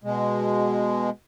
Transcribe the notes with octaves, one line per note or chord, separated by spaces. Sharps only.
B2 G#3